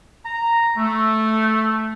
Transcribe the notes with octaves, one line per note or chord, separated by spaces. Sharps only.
A#5
A3